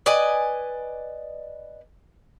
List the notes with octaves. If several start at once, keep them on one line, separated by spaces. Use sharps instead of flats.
B4 D5 D#5 G#5